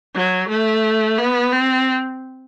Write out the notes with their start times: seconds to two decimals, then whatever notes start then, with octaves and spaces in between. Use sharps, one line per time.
0.15 F#3
0.49 A3
1.18 B3
1.52 C4